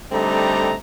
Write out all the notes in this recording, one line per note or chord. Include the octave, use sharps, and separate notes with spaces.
D3 G3 A3 C4 D#4 A#5